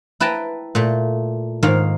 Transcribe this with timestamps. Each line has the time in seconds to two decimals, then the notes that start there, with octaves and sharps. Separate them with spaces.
0.20 E4 B4 G5 A5 A#5
0.75 A#2 A3
1.63 G#2 D#3 A#3 D#4 F5